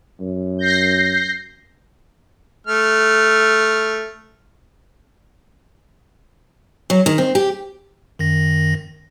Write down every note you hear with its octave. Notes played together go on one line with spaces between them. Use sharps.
F#2
G6 A#6 C7
A3 F6
F#3
D#3
C4
G4
F#2 D#3 A#6